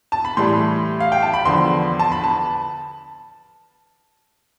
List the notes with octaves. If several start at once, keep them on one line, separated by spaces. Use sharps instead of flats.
A5
B5
A2 E3 G3 C6
F5
G5
A5
B5
E2 D3 F3 C6
A5
B5
A5